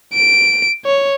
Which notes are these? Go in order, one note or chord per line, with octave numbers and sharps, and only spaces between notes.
D7
C#5